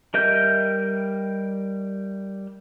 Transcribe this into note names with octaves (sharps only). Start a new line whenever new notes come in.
G3 A#4 D#5 E5 G6